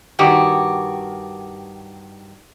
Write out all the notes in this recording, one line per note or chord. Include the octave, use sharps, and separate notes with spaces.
G2 D#3 F#4 G4